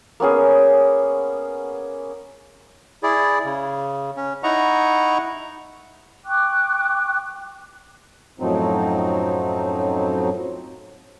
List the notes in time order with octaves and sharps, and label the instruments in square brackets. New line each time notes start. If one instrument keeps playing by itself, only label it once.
[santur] A#3 B3 C#4 G#4
[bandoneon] E4 G#4 D5
C#3
C#4
D#4 E4 D#5 F#5 A#5 C#6
[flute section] G5 C#6 D6 F#6
[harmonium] F#2 A2 F3 F#3 C4 D#4